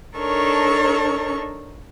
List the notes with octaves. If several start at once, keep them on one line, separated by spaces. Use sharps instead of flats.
D4 D#4 A4 A#4 C#5 C#6